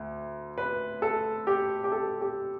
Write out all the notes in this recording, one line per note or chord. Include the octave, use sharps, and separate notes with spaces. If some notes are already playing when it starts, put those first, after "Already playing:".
Already playing: D2
B4
A4
G4
G4
A4
G4